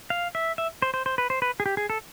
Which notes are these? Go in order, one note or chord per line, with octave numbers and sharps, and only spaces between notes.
F5
E5
E5
C5
C5
C5
B4
C5
B4
G#4
G4
G#4
A4